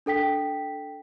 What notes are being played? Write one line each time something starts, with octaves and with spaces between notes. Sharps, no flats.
D4 A4 G5 B6